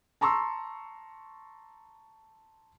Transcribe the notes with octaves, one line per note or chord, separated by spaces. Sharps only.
A5 A#5 C6 C#6 E6